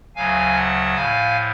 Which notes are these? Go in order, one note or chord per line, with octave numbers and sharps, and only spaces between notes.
D2 C#3 F#3 F5 G#5
F#5 A5
A2 F3 F5 G#5